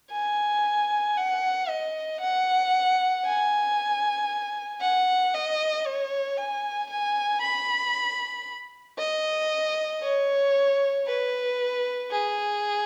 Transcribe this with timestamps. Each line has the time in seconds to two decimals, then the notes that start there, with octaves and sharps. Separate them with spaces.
0.11 G#5
1.16 F#5
1.68 D#5
2.20 F#5
3.24 G#5
4.81 F#5
5.34 D#5
5.86 C#5
6.37 G#5
6.90 G#5
7.41 B5
8.98 D#5
10.02 C#5
11.06 B4
12.11 G#4